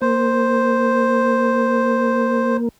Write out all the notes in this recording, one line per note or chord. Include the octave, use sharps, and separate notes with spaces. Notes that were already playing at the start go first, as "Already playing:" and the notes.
A#3 C5